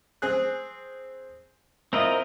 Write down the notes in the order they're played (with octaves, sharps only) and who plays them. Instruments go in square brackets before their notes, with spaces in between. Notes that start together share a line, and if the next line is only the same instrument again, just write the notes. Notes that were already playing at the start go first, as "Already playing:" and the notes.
[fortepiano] C4 G#4 F#6
[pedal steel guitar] C4 A#4 D#5 [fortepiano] E4 F4